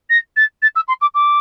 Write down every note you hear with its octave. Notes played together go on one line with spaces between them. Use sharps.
A#6
A6
A6
E6
C6
D6
D6